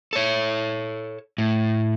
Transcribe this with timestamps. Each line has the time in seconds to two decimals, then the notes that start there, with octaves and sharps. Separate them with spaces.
0.13 A4 C#5
1.38 A2